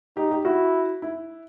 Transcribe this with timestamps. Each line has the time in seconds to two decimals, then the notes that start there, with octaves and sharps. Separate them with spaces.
0.17 D#4 G4
0.31 G4
0.45 E4 F#4
1.02 E4